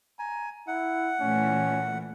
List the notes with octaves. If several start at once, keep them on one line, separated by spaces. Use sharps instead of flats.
G#5 A#5
E4 F#5
A#2 E3 A3 C#4